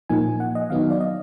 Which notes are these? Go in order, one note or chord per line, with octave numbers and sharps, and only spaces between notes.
A#2 F3 A#3 D#4 G#5
F#5
D#5
D#3 F#3 B3 D#4 F5
D5
D#5